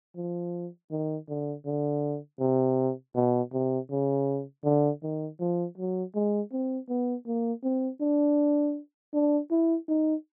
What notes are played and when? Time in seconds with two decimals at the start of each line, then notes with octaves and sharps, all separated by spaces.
0.16 F3
0.91 D#3
1.29 D3
1.66 D3
2.40 C3
3.15 B2
3.53 C3
3.91 C#3
4.64 D3
5.03 D#3
5.40 F3
5.78 F#3
6.15 G#3
6.53 C4
6.89 B3
7.27 A#3
7.64 C4
8.01 D4
9.14 D4
9.51 E4
9.89 D#4